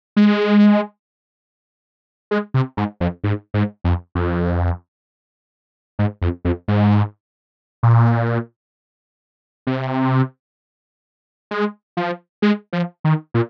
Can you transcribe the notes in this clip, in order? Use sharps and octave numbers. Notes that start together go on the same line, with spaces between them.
G#3
G#3
C3
G#2
F2
G#2
G#2
F2
F2
G#2
F2
F2
G#2
A#2
C3
G#3
F3
G#3
F3
D#3
A#2